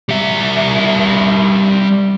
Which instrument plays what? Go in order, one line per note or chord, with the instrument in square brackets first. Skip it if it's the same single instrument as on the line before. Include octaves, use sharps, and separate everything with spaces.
[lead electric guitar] G3 E5